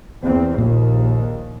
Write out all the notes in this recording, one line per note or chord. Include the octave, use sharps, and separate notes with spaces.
E2 C4
A#1 D#2 A#2